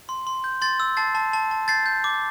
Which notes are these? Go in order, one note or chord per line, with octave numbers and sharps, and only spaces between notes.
C6
C6
G6
C6 A6
E6
A5 A6 C7
A5
A5
A5
G6 A6 C7
G6
D6